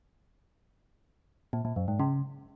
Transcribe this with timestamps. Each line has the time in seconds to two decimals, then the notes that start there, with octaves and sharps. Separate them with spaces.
1.53 A#2
1.65 A#2
1.76 F#2
1.88 G#2
2.00 C#3